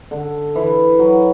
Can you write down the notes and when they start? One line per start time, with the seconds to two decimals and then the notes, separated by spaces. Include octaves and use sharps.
0.11 D3
0.55 E3
0.99 F#3